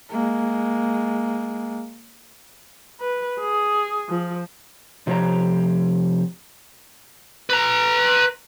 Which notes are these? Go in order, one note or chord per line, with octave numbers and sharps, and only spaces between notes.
G#3 A#3
B4
G#4
F3
C3 F3 E4 G4 C#5 A#5
B4 A#5